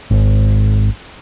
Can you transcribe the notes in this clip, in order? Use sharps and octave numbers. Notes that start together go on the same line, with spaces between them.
G#1